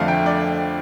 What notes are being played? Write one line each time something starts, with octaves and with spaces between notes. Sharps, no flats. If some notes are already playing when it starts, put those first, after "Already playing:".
Already playing: F2 D3 A3 F5
G5
D5